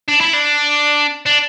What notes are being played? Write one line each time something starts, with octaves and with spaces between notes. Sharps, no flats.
D4
E4
D4
D4